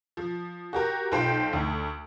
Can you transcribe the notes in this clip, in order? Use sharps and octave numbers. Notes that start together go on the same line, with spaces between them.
F3
F#4 G4 A#4
B1 F4 C5 G5
D2